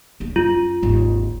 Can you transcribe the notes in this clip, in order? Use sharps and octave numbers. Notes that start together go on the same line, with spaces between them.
D1 D4
F#2 F4
G#1 D#2